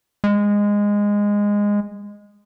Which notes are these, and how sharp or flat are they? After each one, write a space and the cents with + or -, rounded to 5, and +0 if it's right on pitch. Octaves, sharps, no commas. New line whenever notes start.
G#3 -15